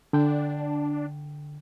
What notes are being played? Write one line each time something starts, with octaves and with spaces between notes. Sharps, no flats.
D3 D4 G5